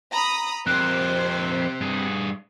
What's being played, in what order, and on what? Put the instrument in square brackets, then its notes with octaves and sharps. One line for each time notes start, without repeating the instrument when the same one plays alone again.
[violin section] A#5 B5 D#6
[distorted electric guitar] F2 A#4 [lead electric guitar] C4 G4 [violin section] C5 [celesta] F#6
[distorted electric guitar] G2 G#4